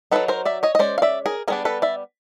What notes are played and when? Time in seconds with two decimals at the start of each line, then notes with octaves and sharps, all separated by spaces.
0.11 F#3 B3 D#4 A4 B4
0.28 A#4 C5
0.45 D5 E5
0.63 C#5 D#5
0.75 D#5
0.79 G#3 C#4 C5 D5
0.98 F5
1.02 D5 E5
1.26 G#4 A#4
1.48 G3 B3 D4 G#4 A#4
1.65 A4 B4
1.82 D5 E5